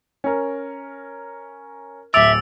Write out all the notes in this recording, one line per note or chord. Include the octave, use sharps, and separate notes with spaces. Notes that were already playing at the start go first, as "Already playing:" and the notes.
C#4 A#4
D1 E5 D6 E6 A6 D7 F7